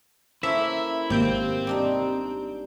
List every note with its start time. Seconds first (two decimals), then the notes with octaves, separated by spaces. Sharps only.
0.43 A#3 C#4 E4 A4 C5 E5
1.10 G#1 C3 A#3 C4 G6 D7
1.67 G3 D4 D#4